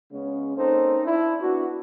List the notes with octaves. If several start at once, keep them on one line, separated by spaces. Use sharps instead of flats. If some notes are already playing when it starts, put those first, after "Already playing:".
C#3 G#3 B3 C#4
A#3 C4 C#4 D#4 A4 C5
D4 E4
B3 D4 E4 F#4